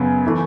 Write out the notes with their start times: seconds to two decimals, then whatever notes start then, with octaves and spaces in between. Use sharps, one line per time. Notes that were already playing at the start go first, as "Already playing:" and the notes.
Already playing: F#2 C#3 B3
0.27 E3 A3